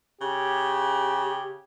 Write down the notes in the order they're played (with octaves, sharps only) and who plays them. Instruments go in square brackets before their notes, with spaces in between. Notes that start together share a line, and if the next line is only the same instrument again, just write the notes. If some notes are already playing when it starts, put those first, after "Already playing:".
[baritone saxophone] C#3 [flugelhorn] G4